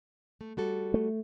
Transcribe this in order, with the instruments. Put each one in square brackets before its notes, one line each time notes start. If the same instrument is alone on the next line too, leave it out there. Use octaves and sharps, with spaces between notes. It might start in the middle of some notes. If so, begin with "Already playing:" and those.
[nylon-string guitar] A3
G3 F#4 A4
[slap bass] A3